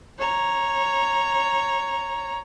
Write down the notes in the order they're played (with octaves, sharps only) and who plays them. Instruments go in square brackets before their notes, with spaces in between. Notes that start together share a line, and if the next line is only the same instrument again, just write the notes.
[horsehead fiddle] C#5 A#5